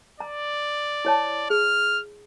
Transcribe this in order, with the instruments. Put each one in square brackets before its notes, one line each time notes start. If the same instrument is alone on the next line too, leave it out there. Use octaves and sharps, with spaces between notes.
[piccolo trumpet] D5 [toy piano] A#5
[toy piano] E4 C#5 A5
[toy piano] G#4 [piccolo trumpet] F6